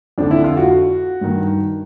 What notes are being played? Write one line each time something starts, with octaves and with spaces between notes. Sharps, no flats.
F2 D3 D4
E4
F4
F#4
G2 D#3